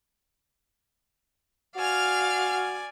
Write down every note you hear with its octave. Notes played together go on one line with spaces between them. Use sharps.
F#4 D5 F5 G#5 F6